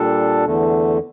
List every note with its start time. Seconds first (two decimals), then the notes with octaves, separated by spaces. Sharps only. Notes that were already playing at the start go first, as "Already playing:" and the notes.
Already playing: A#2 G3 D4 A4
0.45 E2 D3 A3